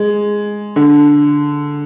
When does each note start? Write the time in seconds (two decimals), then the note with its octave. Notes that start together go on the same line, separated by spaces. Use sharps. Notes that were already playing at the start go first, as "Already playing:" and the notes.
Already playing: G#3
0.76 D3